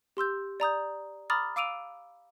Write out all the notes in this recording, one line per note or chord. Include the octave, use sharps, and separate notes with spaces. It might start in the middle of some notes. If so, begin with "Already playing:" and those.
G4 C6 E6 G6
D5 A#5 D#6 G6
A#5 B5 D6 D#6 F6 A6
F5 D6 E6 D7 D#7 F7